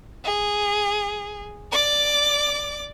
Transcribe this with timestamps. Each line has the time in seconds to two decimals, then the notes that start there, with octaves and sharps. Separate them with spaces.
0.25 G#4
1.72 D5 D6